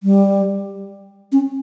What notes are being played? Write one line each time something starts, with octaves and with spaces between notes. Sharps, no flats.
G3
C#4